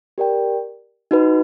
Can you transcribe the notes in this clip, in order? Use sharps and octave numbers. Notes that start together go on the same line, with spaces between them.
G4 A#4 D5 G5
D#4 F#4 B4